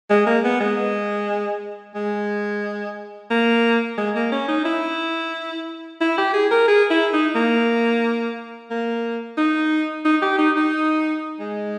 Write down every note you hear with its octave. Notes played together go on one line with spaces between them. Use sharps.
G#3
A#3
B3
G#3
G#3
A#3
G#3
A#3
C#4
D#4
E4
E4
G4
G#4
A#4
G#4
E4
D#4
A#3
A#3
D#4
D#4
G4
D#4
D#4
G#3